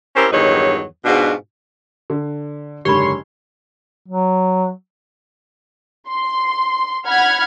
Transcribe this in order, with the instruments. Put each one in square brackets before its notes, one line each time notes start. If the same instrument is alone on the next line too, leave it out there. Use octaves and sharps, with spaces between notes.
[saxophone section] C4 C#4 E4 G4 A#4 C5
E2 G2 D#3 F#3 D#4 C#5
G#2 B2 D4 F4 F#4
[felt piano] D3
[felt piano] F#1 G#2 D3 [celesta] G4 B5 [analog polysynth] C#5 C6
[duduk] F#3
[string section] C6
F#5 B5 F6 G#6